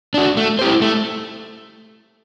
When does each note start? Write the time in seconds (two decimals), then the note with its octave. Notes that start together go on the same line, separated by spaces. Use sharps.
0.14 D4 F#4
0.37 A3
0.59 E4 G4 C5
0.82 A3